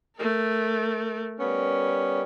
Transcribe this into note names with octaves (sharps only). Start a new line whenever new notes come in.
A3 A#4
G3 B3 C#4 A#4